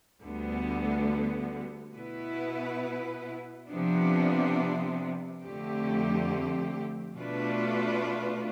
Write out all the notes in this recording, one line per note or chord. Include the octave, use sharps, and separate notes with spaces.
D2 D3 G3 B3
B2 B3 E4 B4
C3 F3 B3 D4
F2 D3 A3 C4 G4
B2 A3 D4 F4 B4